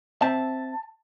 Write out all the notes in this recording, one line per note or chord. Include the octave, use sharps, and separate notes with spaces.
C4 E5 A5